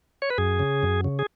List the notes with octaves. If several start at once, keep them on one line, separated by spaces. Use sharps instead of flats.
C#5
B4
F#2 G#4
C#3
F#2
C#3
G#4